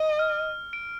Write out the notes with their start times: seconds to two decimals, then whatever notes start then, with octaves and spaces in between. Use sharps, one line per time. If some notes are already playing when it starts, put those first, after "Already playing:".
Already playing: D#5
0.19 F6
0.73 D7